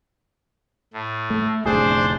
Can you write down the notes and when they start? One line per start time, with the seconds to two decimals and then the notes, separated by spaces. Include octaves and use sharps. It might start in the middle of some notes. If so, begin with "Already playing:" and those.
0.94 A2
1.30 A3
1.66 F1 D2 A2 D4 G#4 C5